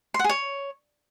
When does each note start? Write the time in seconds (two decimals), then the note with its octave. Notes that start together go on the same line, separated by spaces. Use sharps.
0.14 C6
0.19 F#5
0.24 G#4
0.29 C#5